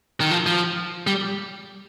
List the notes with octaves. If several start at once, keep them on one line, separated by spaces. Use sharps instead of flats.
D#3
F3
F3
G3